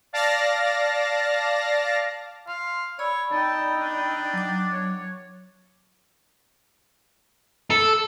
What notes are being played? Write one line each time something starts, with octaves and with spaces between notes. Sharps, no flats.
D5 F5 A5 A#6
F5 C6
C#5 D5 B5 E6
D#4 G5 A5
D4
F#3 D6
C#5
A4